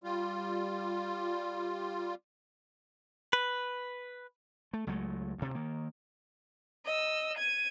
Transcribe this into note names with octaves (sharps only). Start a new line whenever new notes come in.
G3 F4
B4
A3
C#2 F#3 G#3 A3
D2 C3
D#3 A#3
D#5 E6
G#6 D#7